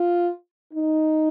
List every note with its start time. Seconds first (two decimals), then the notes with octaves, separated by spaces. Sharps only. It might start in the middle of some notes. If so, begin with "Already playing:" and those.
Already playing: F4
0.73 D#4